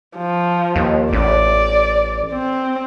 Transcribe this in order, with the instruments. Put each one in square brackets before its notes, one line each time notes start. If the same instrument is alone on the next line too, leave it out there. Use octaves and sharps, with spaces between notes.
[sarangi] F3
[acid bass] D#2
[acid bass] A1 [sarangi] D5
[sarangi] C4